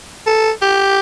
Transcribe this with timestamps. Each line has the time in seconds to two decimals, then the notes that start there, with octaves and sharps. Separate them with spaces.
0.27 A4
0.62 G4